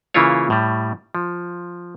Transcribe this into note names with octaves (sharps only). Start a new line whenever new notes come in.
C#3 E3 A#3 E4 F4 C#5
A2 G3
F3